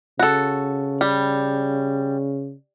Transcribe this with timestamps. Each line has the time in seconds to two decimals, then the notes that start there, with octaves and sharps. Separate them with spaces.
0.19 C#3 F#4 A4
1.01 G3